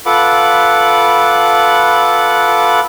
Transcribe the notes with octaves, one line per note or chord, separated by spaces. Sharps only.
F4 A4 B4 F#5 B5 D6